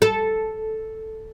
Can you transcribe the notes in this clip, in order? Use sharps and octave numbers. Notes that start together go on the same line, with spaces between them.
A4